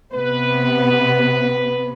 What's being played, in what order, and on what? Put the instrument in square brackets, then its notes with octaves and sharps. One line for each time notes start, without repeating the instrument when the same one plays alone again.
[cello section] C3 B3 [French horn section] B4